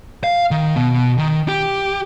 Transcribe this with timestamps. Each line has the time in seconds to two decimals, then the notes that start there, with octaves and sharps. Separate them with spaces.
0.24 F5
0.51 D#3
0.77 B2
1.18 D#3
1.48 G4